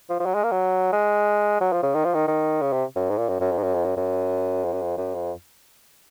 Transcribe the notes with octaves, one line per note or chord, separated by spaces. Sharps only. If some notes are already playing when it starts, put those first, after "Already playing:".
F3
F3
F#3
G#3
A#3
F#3
G#3
F#3
F3
C#3
D#3
F3
D#3
D#3
C#3
C3
F#2
G#2
A#2
F#2
F#2
F2
G#2
F#2
F2
F#2
F#2
F2
F#2
F2
F#2
F2